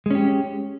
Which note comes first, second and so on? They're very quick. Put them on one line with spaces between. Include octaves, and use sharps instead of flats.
G#3 C#4 G4